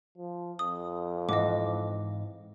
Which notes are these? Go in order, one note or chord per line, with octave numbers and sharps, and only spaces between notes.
F3
F2 D#6
G#2 E3 D#5 D6